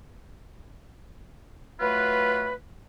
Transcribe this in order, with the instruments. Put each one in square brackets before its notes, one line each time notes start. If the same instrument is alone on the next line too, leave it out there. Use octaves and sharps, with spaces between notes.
[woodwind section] F#3 A3 F4 B4